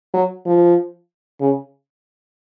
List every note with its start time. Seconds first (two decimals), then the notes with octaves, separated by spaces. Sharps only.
0.14 F#3
0.46 F3
1.41 C#3